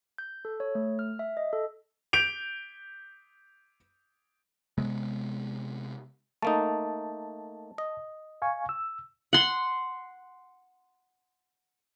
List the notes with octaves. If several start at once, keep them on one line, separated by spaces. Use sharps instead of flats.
G6
A4
C#5
A3
F6
E5
D#5
A4
G6 D7 F7
C3 G#3 B3
A3 A#3 D#4 A5
D#5
F5 G#5 C#6
E6
F#5 C6